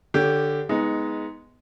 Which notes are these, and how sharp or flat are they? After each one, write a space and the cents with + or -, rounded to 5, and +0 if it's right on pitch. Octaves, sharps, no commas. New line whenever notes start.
D3 +10 G4 +0 C#5 +30
G#3 +0 B3 +0 D#4 +15